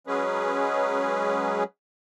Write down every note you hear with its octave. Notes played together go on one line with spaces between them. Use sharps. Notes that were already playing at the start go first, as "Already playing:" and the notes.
F#3 G#3 C#4 G#4 B4